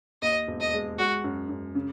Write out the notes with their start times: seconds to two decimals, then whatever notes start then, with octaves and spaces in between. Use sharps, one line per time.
0.22 D#2 D#5
0.47 E1
0.61 D#5
0.74 G#3
0.99 G#3 F#4
1.24 F#2
1.49 F#2
1.75 C#3